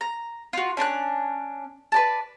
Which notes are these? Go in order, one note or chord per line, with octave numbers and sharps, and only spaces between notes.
A#5
F4 F#4
C#4 D4 A#5 F#6
B4 D5 A5